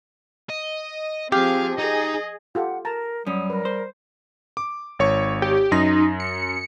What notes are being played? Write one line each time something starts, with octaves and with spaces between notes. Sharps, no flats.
D#5
F3 C4 G4 G#4 F5
D#4 G#4 D#5
F4 G4 A4 F#5
A#4 A5 A#5
F#2 G3 C#4 D#6
A#4 B4
C5
D6
G#1 C#5 C#6
G4
F#2 D#4 C6 A#6
C#7